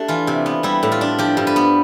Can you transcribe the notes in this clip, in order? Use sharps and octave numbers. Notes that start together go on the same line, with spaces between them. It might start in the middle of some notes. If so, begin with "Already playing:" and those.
Already playing: A3 D4 G4
E3 F4
C3
B3
G3 E4
A2
F4
D4
F3 G4
G2
B4
B3